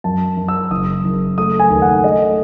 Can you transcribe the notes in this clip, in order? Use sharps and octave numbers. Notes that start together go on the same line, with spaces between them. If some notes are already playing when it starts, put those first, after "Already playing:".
F#2 A5
F#2
E6
F#1 D#6
F#1
A3 D#6
G#5
D#2
F#5
A3 D#5